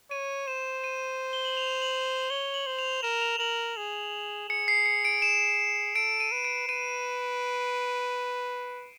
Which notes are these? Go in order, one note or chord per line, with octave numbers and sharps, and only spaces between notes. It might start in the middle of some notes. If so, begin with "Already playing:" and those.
C#5 D#7
C5 E7
D#7
G7
F#7
F7
F#7
G7
F#7
C#5 G7
F#7
C5
F7
A#4 E7
F7
A#4 F#7
G#4
G#4 C#7
C7
C#7
D7
E7
A4 D7
D#7
B4
D7
B4 D#7